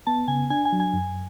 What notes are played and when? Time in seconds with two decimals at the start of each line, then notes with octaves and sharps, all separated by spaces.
0.07 B3 A5
0.28 C#3 G#5
0.50 D4 G#5
0.65 G#5
0.72 F#3
0.80 G#5
0.94 F#2